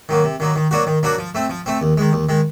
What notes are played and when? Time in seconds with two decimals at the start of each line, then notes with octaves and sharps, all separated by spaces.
0.09 D#3 F#3 A#3
0.24 C3
0.40 D#3 F#3 A#3
0.56 D#3
0.71 F#3 A#3 D4 F#4
0.87 D#3
1.03 F#3 A#3 D4 F#4
1.18 F3
1.35 A3 C4
1.49 F3
1.66 A3 C4
1.81 D#2
1.97 D#3 G#3
2.13 D#2
2.29 D#3 G#3